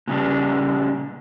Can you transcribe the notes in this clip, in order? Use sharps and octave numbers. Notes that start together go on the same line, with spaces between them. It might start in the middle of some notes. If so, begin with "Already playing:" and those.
A#2 C#3 G3 D4